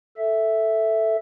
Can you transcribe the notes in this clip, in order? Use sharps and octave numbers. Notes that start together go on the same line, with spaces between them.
A4 E5